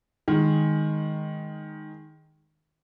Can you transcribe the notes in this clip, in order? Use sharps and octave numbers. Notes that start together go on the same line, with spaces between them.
D#3 G#3